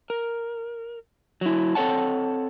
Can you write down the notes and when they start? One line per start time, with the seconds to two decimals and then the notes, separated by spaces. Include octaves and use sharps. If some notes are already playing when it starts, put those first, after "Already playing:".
0.10 A#4
1.41 F#3 E4
1.75 C4 A4 C#5 F#5 A5